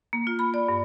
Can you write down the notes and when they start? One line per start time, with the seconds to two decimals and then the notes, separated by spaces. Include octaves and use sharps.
0.13 A#3
0.27 F4
0.39 B5
0.54 D5
0.69 G2